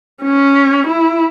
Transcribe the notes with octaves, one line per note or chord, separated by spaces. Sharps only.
C#4
E4